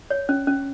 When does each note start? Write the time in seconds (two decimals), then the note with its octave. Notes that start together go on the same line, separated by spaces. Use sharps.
0.10 C#5
0.29 C#4
0.47 C#4